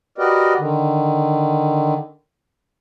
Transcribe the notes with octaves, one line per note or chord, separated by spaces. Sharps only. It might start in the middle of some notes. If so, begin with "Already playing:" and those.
F#4 G4 A#4 B4 D5 D#5
D3 D#3